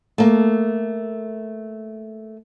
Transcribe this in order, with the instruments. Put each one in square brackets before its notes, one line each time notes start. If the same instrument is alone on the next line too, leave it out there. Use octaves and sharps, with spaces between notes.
[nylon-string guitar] A3 A#3